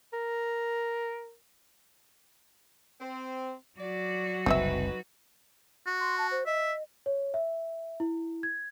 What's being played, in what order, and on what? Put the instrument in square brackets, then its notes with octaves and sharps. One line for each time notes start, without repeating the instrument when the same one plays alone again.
[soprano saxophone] A#4
[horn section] C4
[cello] F#3 F#4 [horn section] D5
[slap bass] F#1 C2 [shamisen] C4 D#5 E5 [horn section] D#4 B4
[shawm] F#4
[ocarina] C6
A5
C5
[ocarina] D#5 [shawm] E5
[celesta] C#5
E5
E4
G#6